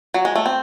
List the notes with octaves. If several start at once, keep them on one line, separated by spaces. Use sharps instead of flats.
F#3
G#3
A3
C4